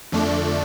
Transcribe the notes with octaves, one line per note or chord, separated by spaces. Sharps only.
F2 D3 A3 D4